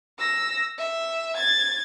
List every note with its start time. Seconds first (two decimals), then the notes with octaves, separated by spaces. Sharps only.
0.19 E6 A#6
0.78 E5
1.36 G#6 A6